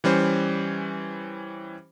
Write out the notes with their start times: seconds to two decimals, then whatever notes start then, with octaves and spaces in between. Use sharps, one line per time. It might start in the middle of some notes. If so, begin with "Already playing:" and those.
0.04 E3 G3 C#4 C5